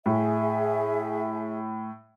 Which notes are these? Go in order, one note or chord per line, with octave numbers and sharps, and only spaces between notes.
A2 G#4 E5